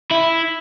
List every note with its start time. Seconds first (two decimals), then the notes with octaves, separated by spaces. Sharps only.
0.11 E4